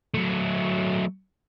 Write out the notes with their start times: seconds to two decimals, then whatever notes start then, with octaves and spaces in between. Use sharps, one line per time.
0.14 F#3 A3